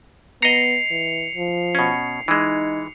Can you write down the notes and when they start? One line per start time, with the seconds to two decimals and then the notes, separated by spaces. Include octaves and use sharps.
0.42 B3 D#5 A#5 C7 C#7 F7
0.90 E3
1.35 F3
1.75 B2 C#4
2.28 E3 G#3 D#4